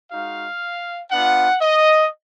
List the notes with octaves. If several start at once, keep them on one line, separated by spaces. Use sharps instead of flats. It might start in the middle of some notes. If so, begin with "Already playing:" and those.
G#3 D#4 F#4 F5
B3 D4 F4 F#5
D#5